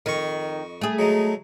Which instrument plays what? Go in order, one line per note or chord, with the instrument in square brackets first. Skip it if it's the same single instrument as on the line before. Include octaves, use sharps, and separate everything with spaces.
[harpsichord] F2 D#5 C#6 [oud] D#3
[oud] A3 G#4
[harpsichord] F#3 G#3 D#4